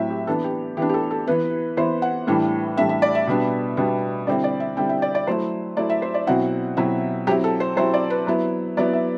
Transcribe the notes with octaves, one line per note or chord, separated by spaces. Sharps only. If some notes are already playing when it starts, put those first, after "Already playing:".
Already playing: A2 F#3 C4 E4 E5 G5
G4
E3 B3 D4 A4
G4
E3 B3 D4 G4
G4
A4
A4
E3 B3 E4 B4
E3 B3 E4 C5
F#5
A2 E3 G3 D4
A2 E3 G3 D4 E5
E5
D5
E5
B2 G3 B3 D4
B2 G3 B3 D4
D3 G3 C4 E4 D5
D5
E5
D3 G3 C4 E4 G5
E5
D5
D5
F#3 A3 E4 C5
F#3 A3 E4 D5
E5
C5
D5
B2 F#3 C4 E4 F#5
B2 F#3 C4 E4 E5
F#3 C4 E4 G4
A4
C5
F#3 C4 E4 C5
D5
B4
F#3 B3 E4
F#3 B3 E4 D5
E5